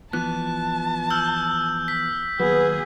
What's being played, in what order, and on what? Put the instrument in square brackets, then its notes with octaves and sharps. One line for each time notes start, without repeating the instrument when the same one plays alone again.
[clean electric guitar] E3 F3 B3 [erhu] A5 [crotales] F#6
[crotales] E6 F6 G6
B6
[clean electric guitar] D#2 F#3 [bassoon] B3 [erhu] G#4